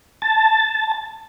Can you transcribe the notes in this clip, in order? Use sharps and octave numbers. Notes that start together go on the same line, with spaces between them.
A5